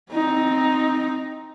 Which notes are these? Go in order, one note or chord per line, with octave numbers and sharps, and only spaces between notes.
C4 D#4